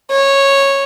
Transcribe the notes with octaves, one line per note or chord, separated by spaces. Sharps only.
C#5